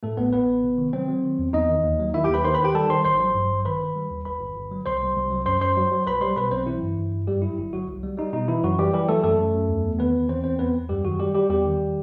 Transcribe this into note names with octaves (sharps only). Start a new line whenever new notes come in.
A2 A3 A4
A1 B3 B4
A1 B3 B4
A1
C3
D#3
F#3 C4 C5
F#3
D#3
E2
E2 D#4 D#5
D#3
D#2
F#3
D#3 E4 E5
D#2 G4 G5
B4 B5
D#3 C5 C6
B4 B5
D#3
G4 G5
G3 A4 A5
D#3 C5 C6
A1 C5 C6
F#3
G2
A1
D#3 B4 B5
D#3
G3
D#2
G1 B4 B5
G1
G1
F#3
C2 C5 C6
C2
C2
F#3
F#2 C5 C6
F#2 C5 C6
F#3
F#3
B1 B4 B5
G3 C5 C6
B2 B4 B5
B1 C4 C5
E3 E4
G2
G2
G2
F#2 G3 G4
F#3 E4
G1 E4
G1 F#3 F#4
C2
G3
G3 D#4
B2 D#4
E3 E4
F#2 F#3 F#4
E3 G3 G4
E3 G3 G4
F#3 A3 A4
F#2 A3 A4
F#2
F#2
E2
E2
D#3 B3 B4
E2
E3 C4 C5
E2 C4 C5
E2 B3 B4
E2
F#2 G3 G4
D#3 F#3 F#4
G3 G4
G3 G4
E2 G3 G4
D#3